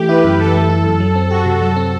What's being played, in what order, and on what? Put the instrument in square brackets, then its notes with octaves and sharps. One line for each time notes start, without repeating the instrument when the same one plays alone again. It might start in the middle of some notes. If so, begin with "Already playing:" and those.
Already playing: [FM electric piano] E3 A3 [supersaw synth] G4
[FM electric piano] E4 [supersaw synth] B4
[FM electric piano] F#2
[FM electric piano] E3 [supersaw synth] A4
[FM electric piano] A3
E4
F#2
F#3
C4
[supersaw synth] F#4 [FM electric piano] G4
[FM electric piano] C3
[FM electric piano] F#3 [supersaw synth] A4
[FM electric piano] C4